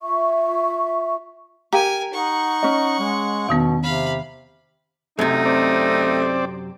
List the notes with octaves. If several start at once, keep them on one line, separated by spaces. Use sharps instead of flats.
F4 E5 C#6
G4 A#4 F5 G#5 A#5
D#4 F#5 C#6
C#4 D#5
G#3
E2 B2 D#3 B3
C3 F5 B5
F#2 C3 A3 D#4
C4 D5